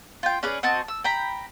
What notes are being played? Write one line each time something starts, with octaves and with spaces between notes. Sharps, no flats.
F4 G5
C#4 G#4 B4 D5
C4 F#4 D#5 A5
E6
G5 A#5 B5